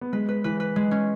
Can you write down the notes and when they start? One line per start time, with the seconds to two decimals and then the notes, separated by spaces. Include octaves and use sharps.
0.01 B3
0.13 G#3 B4
0.29 B4
0.44 E3 B4
0.60 B4
0.76 G#3
0.91 C#4